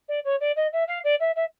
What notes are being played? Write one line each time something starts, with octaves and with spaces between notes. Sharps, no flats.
D5
C#5
D5
D#5
E5
F5
D5
E5
E5